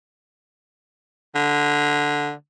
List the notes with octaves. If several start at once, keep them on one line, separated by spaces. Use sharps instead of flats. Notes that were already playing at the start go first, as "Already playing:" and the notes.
D3